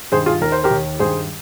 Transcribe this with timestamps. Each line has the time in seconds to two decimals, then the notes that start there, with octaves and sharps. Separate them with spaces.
0.12 G2 D#3 G#4 C5
0.26 F4 G#4
0.41 D#2 D#3 A#4
0.52 C5
0.64 G4 A#4
0.71 D#2 D#3
0.99 G2 D#3 G#4 C5